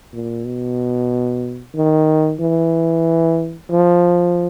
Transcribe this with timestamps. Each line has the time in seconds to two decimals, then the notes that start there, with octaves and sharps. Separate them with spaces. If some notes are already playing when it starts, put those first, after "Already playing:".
0.14 A#2
0.46 B2
1.76 D#3
2.40 E3
3.71 F3